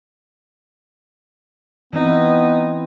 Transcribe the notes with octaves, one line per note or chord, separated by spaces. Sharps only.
E3 B3 C4 D#4 E4